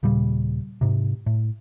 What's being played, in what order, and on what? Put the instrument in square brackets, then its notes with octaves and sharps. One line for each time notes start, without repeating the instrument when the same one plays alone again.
[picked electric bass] D#1 A#2 C#3 G3
G#2 C3
A2